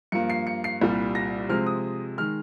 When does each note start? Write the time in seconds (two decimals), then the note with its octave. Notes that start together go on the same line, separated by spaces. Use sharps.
0.12 G2 F3 A#3 C#7
0.30 C7
0.47 C#7
0.64 C7
0.82 C2 A#2 G3
1.15 A#6
1.49 C3 F3 G#3 C4 F6
1.66 D#6
2.18 D#3 G#3 F6